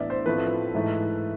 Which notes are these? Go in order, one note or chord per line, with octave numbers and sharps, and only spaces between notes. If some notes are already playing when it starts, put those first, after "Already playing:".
Already playing: A2 E3 B3 D4 D5 E5
C5
A2 F3 A3 C4 B4
G#2 E3 A3